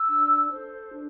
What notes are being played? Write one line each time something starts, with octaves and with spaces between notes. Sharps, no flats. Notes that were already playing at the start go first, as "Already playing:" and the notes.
Already playing: E6
D4
A4 C5
D4